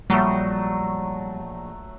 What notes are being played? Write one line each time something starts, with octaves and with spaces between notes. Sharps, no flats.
A#1 F#3 G3 A3 D#6